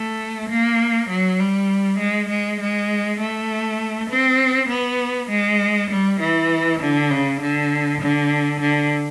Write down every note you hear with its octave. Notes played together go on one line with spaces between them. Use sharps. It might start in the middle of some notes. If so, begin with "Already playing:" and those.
Already playing: A3
A#3
F#3
G3
G#3
G#3
G#3
A3
C4
B3
G#3
G3
E3
D3
C#3
D3
D3
D3